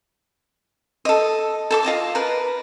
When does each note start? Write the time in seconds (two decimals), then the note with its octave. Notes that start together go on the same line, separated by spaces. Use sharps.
1.05 A4 D#5
1.70 A4 A5 D6
1.83 F4 D#5 A5 D6
2.15 A#4 B4